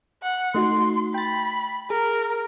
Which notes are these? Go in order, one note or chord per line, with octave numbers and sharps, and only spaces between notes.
F#5
A3 D#4 F#4 C6
G5 B5 A6
G#4 A#4